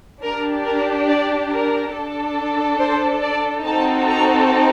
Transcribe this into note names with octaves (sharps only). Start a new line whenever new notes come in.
D4 G4 A#4
A#4
D5
A#4
D4 A4
C5
D5
C4 D#4 F#4 A4 A5
A#5